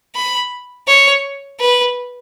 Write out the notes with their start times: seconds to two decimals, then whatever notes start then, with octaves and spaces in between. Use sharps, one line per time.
0.16 B5
0.87 C#5
1.60 B4